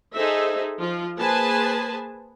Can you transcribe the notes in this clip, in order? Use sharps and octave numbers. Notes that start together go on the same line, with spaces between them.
D#4 G#4 A4 C5 E5
F3 F4
A#3 G#4 B4 C5 G#5 A5